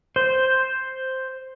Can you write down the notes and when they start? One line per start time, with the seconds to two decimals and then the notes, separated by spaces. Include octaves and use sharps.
0.16 C5